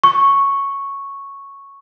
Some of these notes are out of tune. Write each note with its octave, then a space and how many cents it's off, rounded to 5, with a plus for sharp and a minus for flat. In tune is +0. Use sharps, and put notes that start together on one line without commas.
C#6 -5